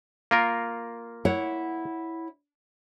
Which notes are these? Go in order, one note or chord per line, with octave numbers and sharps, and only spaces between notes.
A#3 F4 A#4
E4 C#5 F#5